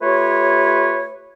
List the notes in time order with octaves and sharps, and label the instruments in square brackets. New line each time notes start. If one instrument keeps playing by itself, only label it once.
[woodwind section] A3 F4 G4 B4 C#5